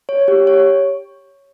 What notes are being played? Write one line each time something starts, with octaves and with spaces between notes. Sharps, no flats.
C#5
G4
C#5